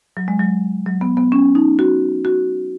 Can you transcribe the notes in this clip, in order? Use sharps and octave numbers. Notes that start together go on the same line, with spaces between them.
F#3
G#3
F#3
F#3
B3
B3
C#4
D#4
F#4
F#4